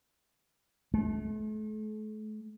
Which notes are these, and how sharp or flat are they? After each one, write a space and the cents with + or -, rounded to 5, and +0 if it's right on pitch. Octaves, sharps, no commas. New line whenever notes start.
A3 -40